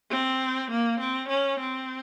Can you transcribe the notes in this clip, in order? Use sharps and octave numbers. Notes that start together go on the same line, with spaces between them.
C4
A#3
C4
C#4
C4